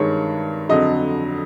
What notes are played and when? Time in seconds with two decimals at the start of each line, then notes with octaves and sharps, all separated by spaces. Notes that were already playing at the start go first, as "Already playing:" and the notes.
Already playing: G2 D#3 G#3 C#5
0.69 F2 D3 F#3 D#5